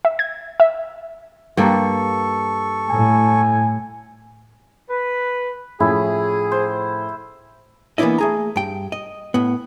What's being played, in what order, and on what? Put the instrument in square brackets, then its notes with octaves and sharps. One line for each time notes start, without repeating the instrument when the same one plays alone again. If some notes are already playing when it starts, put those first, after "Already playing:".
[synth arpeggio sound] E5
G#6
E5
[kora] G2 G3 A#3 [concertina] A4 C#6
[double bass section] A2 [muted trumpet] G#5
[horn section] B4
[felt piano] A2 F3 C#4 [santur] E4 [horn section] G#4
[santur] C5
[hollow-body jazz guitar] E3 A#3 B3 D4 E4 D#5
A3 G#4 A#5
G2 G5
D#5
A2 B3